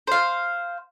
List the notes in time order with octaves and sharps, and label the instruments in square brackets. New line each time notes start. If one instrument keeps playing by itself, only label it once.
[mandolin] C5 F5